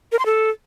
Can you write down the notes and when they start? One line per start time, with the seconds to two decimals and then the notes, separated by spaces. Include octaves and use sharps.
0.12 A#4
0.19 C6
0.26 A4